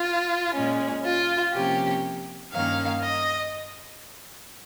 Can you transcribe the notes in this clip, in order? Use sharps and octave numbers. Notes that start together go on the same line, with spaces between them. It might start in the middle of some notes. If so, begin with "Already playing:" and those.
Already playing: F4
A#2 G#3 C#4
F4
C3 F3 A#3 C#4 G4
G2 D#3 A#3 C#4 F5
D#5